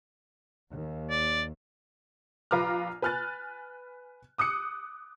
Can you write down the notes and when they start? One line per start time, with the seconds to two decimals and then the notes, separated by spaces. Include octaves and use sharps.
0.71 D#2
1.10 D5
2.51 A#1 F4 B4 A#5 D6 F6
3.02 B4 G#5 F6 F#6 A6
4.38 D6 D#6 F#6 C#7